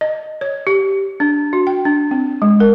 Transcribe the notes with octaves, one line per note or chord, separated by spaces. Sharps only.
D#5
C#5
G4
D4
F#4
G5
D4
C4
G#3
A#4